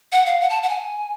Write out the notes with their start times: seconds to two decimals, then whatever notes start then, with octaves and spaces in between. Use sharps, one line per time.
0.12 F#5
0.26 F5
0.41 F#5
0.50 A5
0.63 F#5
0.69 G#5